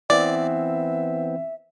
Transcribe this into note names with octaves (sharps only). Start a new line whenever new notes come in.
E3 B3 C4 D5 E5